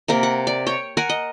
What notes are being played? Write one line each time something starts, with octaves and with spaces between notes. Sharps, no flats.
C3 A#3 A#4
F#5
D5
C#5 G5
A#4 F#5 G#5
D#5